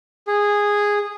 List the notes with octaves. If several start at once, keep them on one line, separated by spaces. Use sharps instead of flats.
G#4